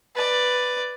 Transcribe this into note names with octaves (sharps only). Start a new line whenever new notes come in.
B4 D5